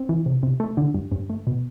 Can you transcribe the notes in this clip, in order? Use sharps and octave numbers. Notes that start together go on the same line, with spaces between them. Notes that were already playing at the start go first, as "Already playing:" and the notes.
Already playing: C4
E3
C3
C3
A3
D3
G2
G2
A3
B2